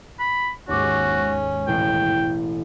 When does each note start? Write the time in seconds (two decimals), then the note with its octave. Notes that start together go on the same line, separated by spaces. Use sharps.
0.19 B5
0.69 D#2 G#2 C#4 F#4 C#6 D6
1.67 E1 A1 G5 C7